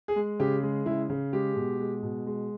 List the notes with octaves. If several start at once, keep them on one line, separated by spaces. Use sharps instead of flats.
G#4
G#3
C#3 G4
G#3
C#3 E4
C#3
G#3 G4
B2
G#3
B2
G#3